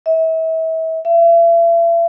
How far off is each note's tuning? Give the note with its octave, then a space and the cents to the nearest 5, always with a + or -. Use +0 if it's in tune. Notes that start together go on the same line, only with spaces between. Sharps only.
E5 -35
E5 +40